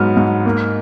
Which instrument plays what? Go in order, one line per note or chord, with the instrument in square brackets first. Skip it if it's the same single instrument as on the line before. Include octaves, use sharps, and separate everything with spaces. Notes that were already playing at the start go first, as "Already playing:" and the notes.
Already playing: [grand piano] G#2 F#3 B3 F6
G#2
A#3